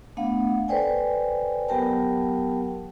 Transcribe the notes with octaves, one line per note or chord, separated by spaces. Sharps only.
A3 B3 D4 F5 F#5
A4 B4 C5 D5 G5 G#5
F#3 B3 G4 A#4 G5 A5